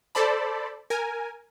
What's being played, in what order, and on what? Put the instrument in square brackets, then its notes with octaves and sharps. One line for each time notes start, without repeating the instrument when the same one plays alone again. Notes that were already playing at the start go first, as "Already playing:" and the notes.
[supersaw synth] A4 C5 D5 A5 B5
A#4 G#5